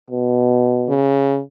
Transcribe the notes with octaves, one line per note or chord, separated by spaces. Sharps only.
B2
C#3